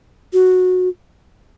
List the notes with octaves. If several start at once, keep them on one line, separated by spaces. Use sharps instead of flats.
F#4